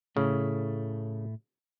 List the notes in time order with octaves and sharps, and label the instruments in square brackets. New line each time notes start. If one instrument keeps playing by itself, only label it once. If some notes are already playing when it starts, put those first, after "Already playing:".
[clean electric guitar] A2 A3 [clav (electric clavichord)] C#3